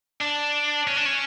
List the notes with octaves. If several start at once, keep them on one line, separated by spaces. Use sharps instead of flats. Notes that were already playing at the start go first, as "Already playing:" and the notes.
D4
C#4
D4
C#4